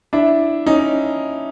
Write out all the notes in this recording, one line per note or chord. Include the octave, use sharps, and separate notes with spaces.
D4 E4
C#4 D#4